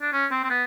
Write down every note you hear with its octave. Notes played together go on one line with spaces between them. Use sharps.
D4
C#4
C4
C4
B3